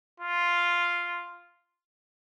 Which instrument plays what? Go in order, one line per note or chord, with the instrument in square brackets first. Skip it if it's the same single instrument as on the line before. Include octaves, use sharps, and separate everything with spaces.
[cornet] F4